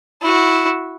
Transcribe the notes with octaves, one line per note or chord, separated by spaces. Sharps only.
E4 F#4